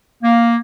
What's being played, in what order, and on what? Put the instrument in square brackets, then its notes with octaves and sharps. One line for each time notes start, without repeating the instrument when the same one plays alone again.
[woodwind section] A#3